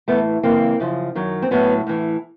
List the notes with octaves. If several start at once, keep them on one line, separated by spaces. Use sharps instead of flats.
A2 E3 A3 B3
F#2 C#3 E3 A#3 C4
F#2 C#3 F3
F#2 D#3 F#3
C4
A2 F#3 B3 C#4
A2 E3